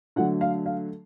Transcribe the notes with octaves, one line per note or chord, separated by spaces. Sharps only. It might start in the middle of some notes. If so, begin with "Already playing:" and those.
D3 F#3 A3 F#5
F5
F5